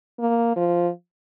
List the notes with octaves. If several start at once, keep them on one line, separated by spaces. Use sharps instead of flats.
A#3
F3